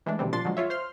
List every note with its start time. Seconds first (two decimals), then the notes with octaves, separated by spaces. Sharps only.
0.06 E3 G#3 A3 D4
0.19 B2 D3 E3 G3 C4
0.33 A#2 F3 D4 C6 A6
0.45 D3 F3 F#3 G#3
0.57 F4 C#5 E5
0.70 C5 C6 F6